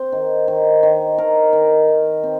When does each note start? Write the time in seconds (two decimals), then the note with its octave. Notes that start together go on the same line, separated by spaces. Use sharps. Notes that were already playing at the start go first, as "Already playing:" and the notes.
Already playing: C4 C5
0.12 D#3
0.48 D#3
0.83 D#3
1.18 D#3 A#4
1.53 D#3
1.88 D#3
2.23 C4